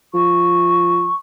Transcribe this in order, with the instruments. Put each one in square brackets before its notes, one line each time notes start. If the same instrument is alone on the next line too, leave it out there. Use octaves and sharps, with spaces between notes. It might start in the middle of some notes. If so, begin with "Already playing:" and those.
[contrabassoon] F3 [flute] C#6